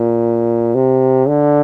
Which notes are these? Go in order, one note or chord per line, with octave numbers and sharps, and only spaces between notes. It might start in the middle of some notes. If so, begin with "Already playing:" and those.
Already playing: A#2
C3
D3